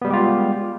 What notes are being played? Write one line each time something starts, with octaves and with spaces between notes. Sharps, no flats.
G3 G#3 B3 F4 G4